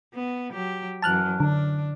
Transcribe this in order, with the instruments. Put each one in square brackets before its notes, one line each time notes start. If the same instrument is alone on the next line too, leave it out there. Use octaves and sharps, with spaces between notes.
[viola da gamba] B3
F#3 G4
[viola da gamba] F#2 E3 F#3 [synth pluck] A5 F6 F#6
[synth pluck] D3 [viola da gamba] D4